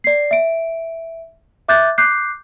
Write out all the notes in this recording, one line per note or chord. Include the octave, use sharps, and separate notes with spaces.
D5 C7
E5 D7
E5 D6 F#6 G6 A6
D6 F#6 G6 C7